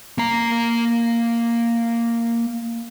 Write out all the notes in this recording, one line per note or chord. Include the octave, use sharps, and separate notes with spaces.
A#3 A#5